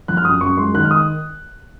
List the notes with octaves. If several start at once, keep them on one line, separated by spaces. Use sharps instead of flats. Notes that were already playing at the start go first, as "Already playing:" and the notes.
F3 F#6
F6
F#2 D#6
F#2 C#6
G#3 C6
D#3 F#6
F6
D#6